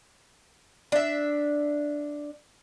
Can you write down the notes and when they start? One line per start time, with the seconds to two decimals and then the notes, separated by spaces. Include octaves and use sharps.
0.92 D4 E5